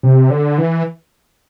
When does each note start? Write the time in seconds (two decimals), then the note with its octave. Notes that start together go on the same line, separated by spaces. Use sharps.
0.03 C3
0.30 D3
0.58 E3